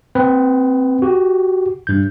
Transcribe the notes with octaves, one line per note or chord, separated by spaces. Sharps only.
C4 B4
F#4 G4
G2 G6